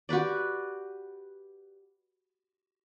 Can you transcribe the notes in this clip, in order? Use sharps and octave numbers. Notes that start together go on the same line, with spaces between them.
F#4 G4 B4 D5